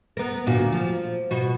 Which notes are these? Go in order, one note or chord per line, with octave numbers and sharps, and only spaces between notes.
B3 A#4
D2 A#2 F#4
F3
B2 F#4